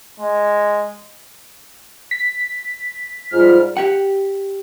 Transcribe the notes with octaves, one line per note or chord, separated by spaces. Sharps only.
G#3
B6
G#2 G3 F4 F6
G4 F#5